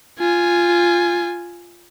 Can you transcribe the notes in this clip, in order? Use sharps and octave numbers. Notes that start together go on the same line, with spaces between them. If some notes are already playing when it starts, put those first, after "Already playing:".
F4 G#5